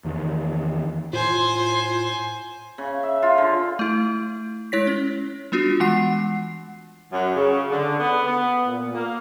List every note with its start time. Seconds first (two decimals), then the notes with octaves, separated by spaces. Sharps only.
0.04 E2 D#3
1.13 A2 F4 C5 G#5
2.78 C#3
3.03 E5
3.23 F4
3.38 D3
3.79 A3 E4
4.72 G#3 E4 C#5 A#6 B6
4.87 C#4
5.52 G3 B3 D4 F4 F#4
5.80 E3 G#3 F#5 C7
7.12 F#2
7.35 C#3
7.70 D3
8.00 B3
8.26 B3
8.66 A#2
8.94 A#3